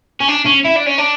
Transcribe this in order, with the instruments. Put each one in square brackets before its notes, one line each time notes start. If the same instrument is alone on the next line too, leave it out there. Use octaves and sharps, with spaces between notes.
[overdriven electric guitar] C#4
D4
C#4
E4
D4
C#4
D4